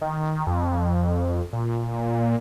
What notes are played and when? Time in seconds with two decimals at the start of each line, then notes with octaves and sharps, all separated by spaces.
0.01 D#3
0.47 F2
1.53 A#2